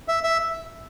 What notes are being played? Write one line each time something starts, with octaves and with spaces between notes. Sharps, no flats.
E5
E5